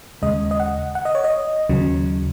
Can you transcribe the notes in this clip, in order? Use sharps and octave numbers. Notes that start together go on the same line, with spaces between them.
D#2 C#3 G#3 D#5
D#5
F#5
F#5
D#5
C#5
D#5
D#2 C#3 F#3